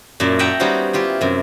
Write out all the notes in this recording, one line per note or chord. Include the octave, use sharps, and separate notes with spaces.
F#2 A#2 A#3 E4 A5
D#5 E5 F#5 G5 A5 A#5
G3 B3 C#4 D#4 F#4 C5
E4 F4 G4
F#2 C3